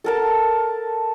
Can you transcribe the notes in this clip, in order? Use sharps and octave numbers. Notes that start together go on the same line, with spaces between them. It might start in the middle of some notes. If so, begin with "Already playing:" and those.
A4 A#4 A5